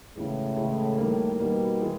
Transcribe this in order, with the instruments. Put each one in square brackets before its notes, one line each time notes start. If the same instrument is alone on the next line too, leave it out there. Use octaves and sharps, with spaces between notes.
[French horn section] A2 [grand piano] C#3 E3 G#3
[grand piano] C#3 E3 G#3
D#3 G3 A#3
[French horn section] B2 [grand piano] D#3 G3 A#3
[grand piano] E3 G#3